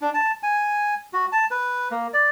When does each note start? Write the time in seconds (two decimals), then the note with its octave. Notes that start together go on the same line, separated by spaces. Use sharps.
0.01 D4
0.14 A5
0.43 G#5
1.13 F#4
1.32 A5
1.51 B4
1.91 A#3
2.13 D5